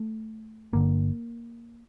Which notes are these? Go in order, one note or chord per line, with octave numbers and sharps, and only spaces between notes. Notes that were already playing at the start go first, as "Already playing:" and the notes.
Already playing: A3
G1 G2 D3 A#3